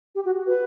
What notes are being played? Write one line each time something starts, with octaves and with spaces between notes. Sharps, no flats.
G4
F#4
B4